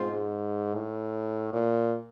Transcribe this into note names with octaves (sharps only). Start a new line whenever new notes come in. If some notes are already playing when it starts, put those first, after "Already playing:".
Already playing: G#2 B2 G#3 C4 F4
A2
A#2